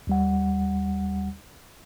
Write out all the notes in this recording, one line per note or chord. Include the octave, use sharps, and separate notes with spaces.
D#2 G3 F#5